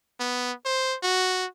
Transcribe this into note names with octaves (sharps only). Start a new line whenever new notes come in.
B3
C5
F#4